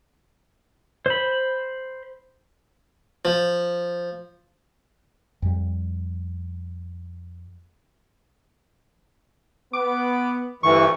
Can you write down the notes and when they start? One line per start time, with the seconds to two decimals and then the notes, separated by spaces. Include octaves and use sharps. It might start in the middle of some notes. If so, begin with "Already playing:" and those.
1.06 C5 B5
3.25 F3
5.42 F2 G3
9.74 B3 D6
10.63 D2 G2 E3 C#6